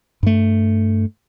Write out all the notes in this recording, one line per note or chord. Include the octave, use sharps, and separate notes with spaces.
G2 A3